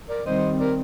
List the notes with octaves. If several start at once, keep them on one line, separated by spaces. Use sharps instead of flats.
A#4 D5
D#3 G3 C4 C5 D#5
A#4 D5